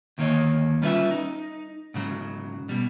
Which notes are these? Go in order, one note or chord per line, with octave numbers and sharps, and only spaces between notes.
D2 D#3 A#3 F#4 C#5 D#5
G3 C#4 F4 B4 C5 E5
D#4
G#2 C#3 F#3
B2 G3